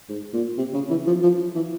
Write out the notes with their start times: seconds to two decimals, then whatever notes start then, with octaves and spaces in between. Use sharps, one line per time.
0.09 G#2
0.33 A#2
0.58 C3
0.74 C#3
0.90 E3
1.07 F3
1.22 F3
1.55 E3